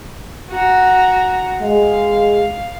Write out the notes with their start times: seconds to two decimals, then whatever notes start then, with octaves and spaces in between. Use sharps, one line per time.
0.49 F#4 A#5
1.61 G#3 F5